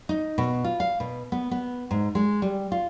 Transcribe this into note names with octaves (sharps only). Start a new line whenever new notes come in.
D#4
B2
F4
F5
B2
B3
B3
G#2
G#3
G3
F4